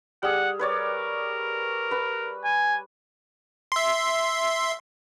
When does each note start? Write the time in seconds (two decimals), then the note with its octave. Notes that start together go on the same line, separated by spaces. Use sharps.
0.23 G3 G#4 F#5
0.59 A#4 B4 C#5 D5
1.91 B4 B5
2.44 G#5
3.72 E5 C6